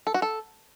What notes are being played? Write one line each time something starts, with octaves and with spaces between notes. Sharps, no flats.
A4
F#4
A4